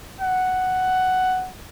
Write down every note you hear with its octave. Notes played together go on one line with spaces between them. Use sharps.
F#5